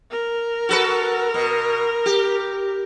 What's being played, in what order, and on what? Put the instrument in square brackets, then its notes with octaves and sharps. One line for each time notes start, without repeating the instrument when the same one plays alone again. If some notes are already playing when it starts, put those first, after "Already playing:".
[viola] A#4
[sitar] F#4 A4 B4
B2
G4